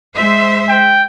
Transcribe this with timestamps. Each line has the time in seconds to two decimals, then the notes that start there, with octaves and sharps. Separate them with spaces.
0.14 G#3 C5 E5
0.69 G5